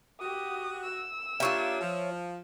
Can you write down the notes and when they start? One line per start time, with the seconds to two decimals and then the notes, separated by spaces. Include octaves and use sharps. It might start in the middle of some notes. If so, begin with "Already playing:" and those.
0.20 F#4 G4 D#6
0.84 E6
1.40 A#3 D4 F4 G4 C#5 E5
1.81 F3